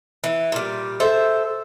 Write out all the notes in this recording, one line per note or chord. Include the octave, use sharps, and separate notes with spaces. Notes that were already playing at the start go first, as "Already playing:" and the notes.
E3
A#2 G3
A4 C5 E5